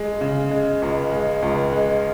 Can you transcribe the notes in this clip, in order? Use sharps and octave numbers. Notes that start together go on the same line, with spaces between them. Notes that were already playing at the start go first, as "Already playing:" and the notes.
Already playing: G#3
C#3
G#3
C#2
G#3
C#2
G#3